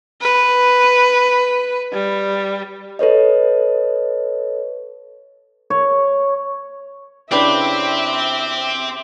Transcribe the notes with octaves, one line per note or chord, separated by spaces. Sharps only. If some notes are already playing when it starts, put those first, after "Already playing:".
B4
G3
A4 B4 C#5 D#5
C#5
C#3 C4 D4 E4 G4 B4 E5 D6